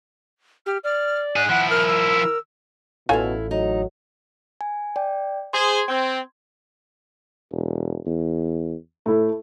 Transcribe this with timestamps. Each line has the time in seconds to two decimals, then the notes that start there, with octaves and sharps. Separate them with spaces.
0.66 G4 F6
0.84 D5 F6
1.36 D#4 G#4 F#6
1.49 F3 E4 F#5
1.70 A#4 F6
1.87 E6
3.09 A1 B2 E4 F4 A4 C#5 F5 G#5
3.51 F#3 D#4
4.61 G#5
4.96 D5 G5
5.53 G#4 C5 C6 G#6
5.88 C4
7.52 E1
8.06 E2
9.06 A2 A3 E4